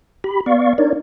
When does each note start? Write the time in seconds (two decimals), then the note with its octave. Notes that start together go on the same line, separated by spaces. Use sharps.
0.24 G4 B5
0.46 B3 D5 F5 C#6
0.78 D4 D#4 A#4 C#5 D5